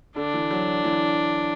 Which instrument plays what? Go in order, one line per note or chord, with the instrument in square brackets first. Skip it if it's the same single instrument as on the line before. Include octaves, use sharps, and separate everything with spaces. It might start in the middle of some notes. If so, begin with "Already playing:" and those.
[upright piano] D3 [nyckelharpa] D4
[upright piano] E3
F#3
E3